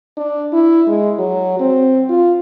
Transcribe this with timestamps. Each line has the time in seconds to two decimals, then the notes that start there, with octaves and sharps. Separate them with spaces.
0.17 D4
0.53 E4
0.87 G#3
1.18 F#3
1.59 C4
2.09 F4